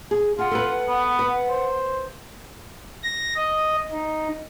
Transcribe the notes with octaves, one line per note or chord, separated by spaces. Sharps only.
G#4
F4 G#4 F#5
A4 B4
B3
B4
C5
A#6
D#5
D#4